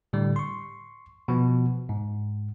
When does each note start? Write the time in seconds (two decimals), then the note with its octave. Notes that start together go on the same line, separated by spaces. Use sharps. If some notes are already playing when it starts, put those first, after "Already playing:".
0.13 A2 D3 G3
0.36 C6 C#6
1.28 B2 F3 B3
1.89 G#2